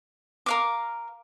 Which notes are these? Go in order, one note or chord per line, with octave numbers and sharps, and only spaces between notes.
A#4 F5 D6